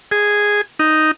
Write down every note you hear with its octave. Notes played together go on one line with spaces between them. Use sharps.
G#4
D#4